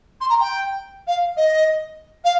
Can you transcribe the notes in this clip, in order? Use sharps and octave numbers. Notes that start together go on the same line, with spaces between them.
C6
A#5
G5
F5
D#5
F5